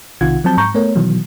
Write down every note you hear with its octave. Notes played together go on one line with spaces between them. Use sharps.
B1 C3 D#3 F4 F#5 G#6
F3 F#3 C4 A5 G6
G#2 A#5 C#6 G6
A3 B3 A#4 C#5
B2 D#3 E3 F#3